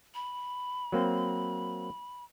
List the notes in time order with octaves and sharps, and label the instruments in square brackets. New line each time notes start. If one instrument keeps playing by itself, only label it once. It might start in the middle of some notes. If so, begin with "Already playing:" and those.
[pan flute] B5
[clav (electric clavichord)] F#3 A#3 C4